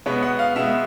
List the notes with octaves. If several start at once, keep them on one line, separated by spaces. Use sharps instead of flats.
B2 G#3 B3 C#5
F#5
F5
B2 G#3 B3 E5